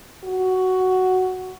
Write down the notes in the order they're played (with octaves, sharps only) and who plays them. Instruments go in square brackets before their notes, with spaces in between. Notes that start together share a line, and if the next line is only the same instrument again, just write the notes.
[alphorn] F#4